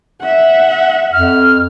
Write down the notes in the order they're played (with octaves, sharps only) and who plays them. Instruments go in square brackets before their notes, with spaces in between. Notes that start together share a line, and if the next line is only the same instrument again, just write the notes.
[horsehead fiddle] E5 F#5
[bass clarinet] F2 [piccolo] F6